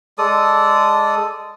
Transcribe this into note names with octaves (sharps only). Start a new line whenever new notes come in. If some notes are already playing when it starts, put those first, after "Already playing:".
G#3 A4 D5 D#6